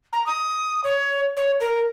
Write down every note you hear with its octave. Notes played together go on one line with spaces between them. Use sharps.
A#5
D#6
C#5
C#5
A#4